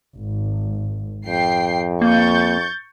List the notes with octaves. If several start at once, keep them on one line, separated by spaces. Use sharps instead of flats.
G#1
F2 G5 C7
A#3 C#6 G6 A6